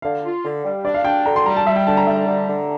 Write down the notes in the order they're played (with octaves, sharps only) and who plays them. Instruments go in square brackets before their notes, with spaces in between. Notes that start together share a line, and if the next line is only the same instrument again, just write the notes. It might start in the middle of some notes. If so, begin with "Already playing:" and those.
[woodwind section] D3 [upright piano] F5
[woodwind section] F4
D3
G3
[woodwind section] D4 [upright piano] D5
[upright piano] F5
[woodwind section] D4 [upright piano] G5
[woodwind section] D3 [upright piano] A#5
[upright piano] C6
[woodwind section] G3 [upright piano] A#5
[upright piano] A5
[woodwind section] G3 [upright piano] E5
[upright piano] G5
[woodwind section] D3 [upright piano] A5
[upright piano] A#5
[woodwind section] G3 [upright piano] E5
[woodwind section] D3
D3